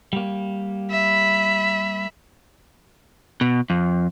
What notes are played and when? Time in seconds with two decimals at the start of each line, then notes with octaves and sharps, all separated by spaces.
0.13 G3 A#3
0.91 E5 B5
3.41 B2
3.70 F2